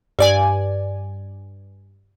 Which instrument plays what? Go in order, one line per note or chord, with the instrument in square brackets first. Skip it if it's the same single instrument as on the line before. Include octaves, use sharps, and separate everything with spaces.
[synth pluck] G2 D5 G#5